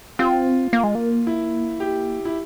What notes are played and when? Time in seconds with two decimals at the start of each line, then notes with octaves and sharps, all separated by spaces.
0.19 C4 F4
0.73 A#3
0.84 G#3
0.95 A#3
1.27 E4
1.80 G4
2.25 E4